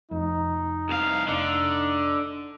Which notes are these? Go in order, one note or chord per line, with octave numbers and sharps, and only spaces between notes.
F1 F2 D#4
C2 F5
F1 D3 D#4